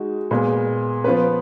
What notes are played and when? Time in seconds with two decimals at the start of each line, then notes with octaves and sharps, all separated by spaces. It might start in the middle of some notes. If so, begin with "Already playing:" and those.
Already playing: G#3 D#4 F#4
0.31 A#2 G#3 B3
1.04 F3 B3 F4 B4